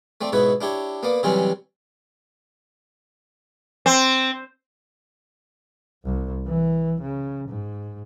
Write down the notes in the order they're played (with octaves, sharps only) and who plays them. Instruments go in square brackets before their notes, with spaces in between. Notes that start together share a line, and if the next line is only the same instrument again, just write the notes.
[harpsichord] A3 C4 D5
G#2 B2 E4 B4 C#5
D4 E4 G4 C#5
A#3 B3 D5
C3 E3 F#3 G3 C4 C#4
[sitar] C4
[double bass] C2
E3
C#3
G#2